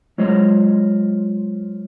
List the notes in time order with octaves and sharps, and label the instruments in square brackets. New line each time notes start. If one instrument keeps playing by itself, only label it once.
[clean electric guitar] F#3 G#3 F4 C5 C#5 D#5